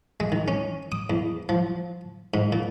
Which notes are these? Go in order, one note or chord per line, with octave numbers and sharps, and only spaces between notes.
G#3
D#3
C#4
D#6
E2
F3
G#2
A#2